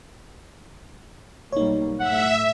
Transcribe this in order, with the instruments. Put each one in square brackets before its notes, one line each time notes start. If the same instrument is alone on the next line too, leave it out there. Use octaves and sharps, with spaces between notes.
[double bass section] B1 G3 A#3 [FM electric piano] D#4 C#5
[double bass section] A2 [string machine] E5 [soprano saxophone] F#5